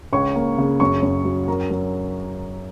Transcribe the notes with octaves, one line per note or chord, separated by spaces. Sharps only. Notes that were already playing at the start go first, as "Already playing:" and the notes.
C#2 C#5 C#6
A#3
C#3
F#2 C#5 C#6
F#2
F#3
F#3 A#4 A#5
F#3